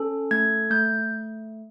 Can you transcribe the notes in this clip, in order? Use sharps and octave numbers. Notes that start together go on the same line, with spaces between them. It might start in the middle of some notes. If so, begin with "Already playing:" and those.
Already playing: C#4 A4
A3 G#6
A3 G6